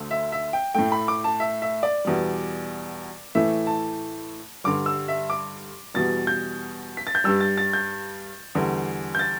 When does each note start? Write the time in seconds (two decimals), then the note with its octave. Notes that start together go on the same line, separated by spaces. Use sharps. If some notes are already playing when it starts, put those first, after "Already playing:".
Already playing: D2 D3 A3
0.11 E5
0.32 E5
0.53 G5
0.74 A2 A3 G5
0.92 B5
1.08 D6
1.24 A5
1.40 E5
1.62 E5
1.83 D5
2.05 E2 B2 G3
3.35 A2 E3 A3 E5
3.67 A5
4.64 G2 D3 G3 D6
4.86 E6
5.08 E5
5.30 D6
5.94 E2 B2 G3 A6
6.27 G6
6.97 B6
7.07 A6
7.15 G6
7.24 G2 G3 E6
7.40 A6
7.58 A6
7.73 G6
8.55 E2 D3 G3
9.15 G6
9.19 A6